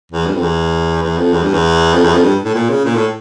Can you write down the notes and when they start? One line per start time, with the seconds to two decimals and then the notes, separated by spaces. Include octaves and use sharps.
0.12 E2
0.27 G2
0.34 F2
0.42 E2
1.02 E2
1.18 F2
1.33 E2
1.43 G2
1.54 E2
1.94 F2
2.04 E2
2.14 F2
2.24 G2
2.45 A2
2.55 A#2
2.70 C#3
2.85 A#2
2.95 A2